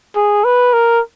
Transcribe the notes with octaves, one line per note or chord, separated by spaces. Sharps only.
G#4
B4
A#4